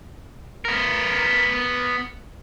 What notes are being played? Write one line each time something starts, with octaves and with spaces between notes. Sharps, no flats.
B3 A#4